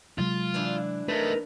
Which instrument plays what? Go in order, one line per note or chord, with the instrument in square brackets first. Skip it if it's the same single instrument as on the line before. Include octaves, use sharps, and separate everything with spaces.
[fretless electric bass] C3 F#3 G#3 [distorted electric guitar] F4
[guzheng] E3 D4 E4
[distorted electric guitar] A3 D#4 [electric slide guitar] A#4 B4